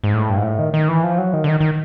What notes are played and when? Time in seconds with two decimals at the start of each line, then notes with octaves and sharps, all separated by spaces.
0.04 G#2
0.14 A2
0.29 G2
0.37 G#2
0.44 A2
0.59 D#3
0.74 D#3
0.88 E3
1.04 F3
1.18 F#3
1.33 D#3
1.44 D3
1.49 D#3
1.61 D#3